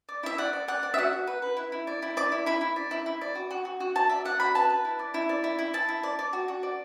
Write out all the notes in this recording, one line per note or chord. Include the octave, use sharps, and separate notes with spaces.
D5
E4 E5
D5 F#5
D5
D5 F#5
D5
E5
F#4 F#5
F#4
B4
B4
E4
E4
D5
E4
D5 D6
E4
E4 B5
E4
D5
E4
E4
D5
F#4
F#4
F#4
F#4
F#4 A5
D5 E5
D5 F#5
F#4 B5
B4 A5
B4
E4
D5
E4
D5
E4
E4
E4 A5
E4
D5
D5
F#4
F#4
D5